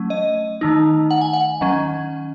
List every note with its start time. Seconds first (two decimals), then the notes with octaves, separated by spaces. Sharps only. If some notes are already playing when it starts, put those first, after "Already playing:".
Already playing: F#3 A3 C#4
0.10 D#5
0.61 D#3 A3 D#4
1.11 F#5
1.21 G#5
1.33 F#5
1.61 D#3 F#3 C#4